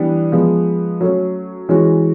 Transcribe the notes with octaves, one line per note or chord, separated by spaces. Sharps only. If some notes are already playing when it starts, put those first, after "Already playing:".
Already playing: E3 G3 B3 D4
F3 G#3 B3
F#3 A3 C#4
E3 G#3 C#4 F#4